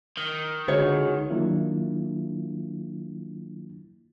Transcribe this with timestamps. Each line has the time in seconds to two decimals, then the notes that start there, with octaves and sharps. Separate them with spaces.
0.17 D#3
0.68 C#2 D3 G#3 F#4 C#5
1.30 D#3 F#3 A#3 D4 E4 F4